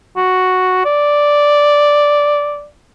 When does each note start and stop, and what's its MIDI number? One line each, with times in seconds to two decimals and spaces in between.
0.17 0.83 66
0.85 2.66 74